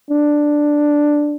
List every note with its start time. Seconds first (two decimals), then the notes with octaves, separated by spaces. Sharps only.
0.11 D4